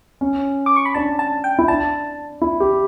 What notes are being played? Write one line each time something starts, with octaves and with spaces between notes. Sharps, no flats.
C#4
D6
C#6
B5
D4 A5
A5
G5
E4
D4 A5
E4
G4